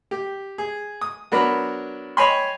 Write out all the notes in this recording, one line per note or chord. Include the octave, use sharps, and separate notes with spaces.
G4
G#4
D#6
F#3 B3 D4 A#4 B5
C#5 D#5 G5 G#5 B5 C6